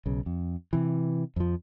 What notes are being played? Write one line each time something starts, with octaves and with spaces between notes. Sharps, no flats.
B1 C#3
F2
C3 E3
F2 F3